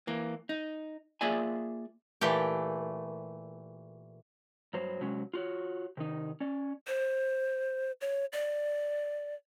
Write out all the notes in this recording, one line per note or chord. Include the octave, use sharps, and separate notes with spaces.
E3 A#3
D#4
A#3 F4 G#4 D5 E5 G#5
A#2 E3 A3 G4
G2 F#3 C5
C3 F#3 G#3 C#4 F#4
F4 F#4 C#5
C3 D#3 D#4
C#4 D5
C5
C#5
D5